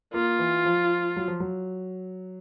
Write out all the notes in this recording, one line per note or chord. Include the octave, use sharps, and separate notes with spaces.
A#3 F4
E3
F3
F#3
F3
F#3